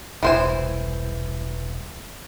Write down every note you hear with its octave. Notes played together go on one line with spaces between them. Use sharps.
E1 C2 E3 C5 G#5